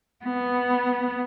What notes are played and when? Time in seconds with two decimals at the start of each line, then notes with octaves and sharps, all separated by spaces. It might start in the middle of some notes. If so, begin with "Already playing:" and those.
0.24 B3